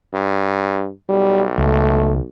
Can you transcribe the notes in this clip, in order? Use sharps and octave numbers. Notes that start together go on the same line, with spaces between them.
G2
B1 G3
C#2 A3